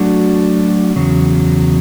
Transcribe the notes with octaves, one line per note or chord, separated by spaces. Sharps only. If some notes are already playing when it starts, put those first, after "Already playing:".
Already playing: F#3 A3 D4 F#4
E2 C#3 F#3